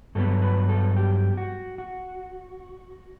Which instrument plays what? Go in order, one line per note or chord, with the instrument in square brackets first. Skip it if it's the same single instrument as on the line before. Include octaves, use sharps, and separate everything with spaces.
[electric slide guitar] G2 F#3 B3 A4
B4
A4
G4
F#4
F#4